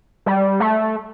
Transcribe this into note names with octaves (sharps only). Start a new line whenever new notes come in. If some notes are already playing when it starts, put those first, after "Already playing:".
G3
A3